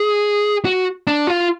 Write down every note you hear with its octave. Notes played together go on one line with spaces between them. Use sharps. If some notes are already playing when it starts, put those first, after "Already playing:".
Already playing: G#4
F#4
D4
F4